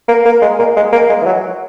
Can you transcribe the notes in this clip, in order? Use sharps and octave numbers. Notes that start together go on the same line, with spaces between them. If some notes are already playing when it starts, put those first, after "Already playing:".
A#3
A#3
G#3
A#3
G#3
A#3
G#3
E3
F#3